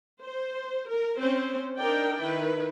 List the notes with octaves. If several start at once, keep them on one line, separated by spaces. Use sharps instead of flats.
C5
A#4
C4 C#4 C5
D4 D#4 A#4 D5 G5
D#3 E4 B4